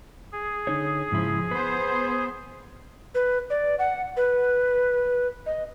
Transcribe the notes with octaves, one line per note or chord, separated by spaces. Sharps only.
G#4
D3 D#4 C#5
G#2 C#3 F3 E4
B3 B4 C5
B4
D5
F#5
B4
D#5